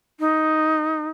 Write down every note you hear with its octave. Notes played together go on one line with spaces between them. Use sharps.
D#4